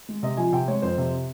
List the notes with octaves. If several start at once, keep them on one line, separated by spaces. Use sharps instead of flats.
G#3
C3 D#5
F3 G#5
C3 G5
G#3 C#5
F2 C5
C3